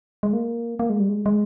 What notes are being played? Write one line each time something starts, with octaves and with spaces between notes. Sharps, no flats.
G#3
A#3
A#3
G#3
G3
G#3
G#3